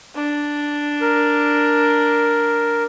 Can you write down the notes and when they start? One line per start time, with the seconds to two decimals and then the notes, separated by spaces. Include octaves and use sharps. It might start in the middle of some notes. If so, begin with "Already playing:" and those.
0.15 D4
1.01 A#4